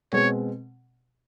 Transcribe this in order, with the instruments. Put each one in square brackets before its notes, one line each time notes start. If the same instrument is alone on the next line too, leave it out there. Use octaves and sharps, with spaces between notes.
[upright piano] B2 G#3 C4 [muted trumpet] C#5